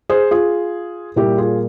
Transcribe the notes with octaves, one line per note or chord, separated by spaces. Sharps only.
G#4 C5
F4 G#4
A#2 G3 A#3 E4 G4
F4 G#4